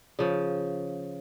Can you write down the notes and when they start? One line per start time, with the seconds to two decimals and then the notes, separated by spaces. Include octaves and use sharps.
0.19 C#3 F3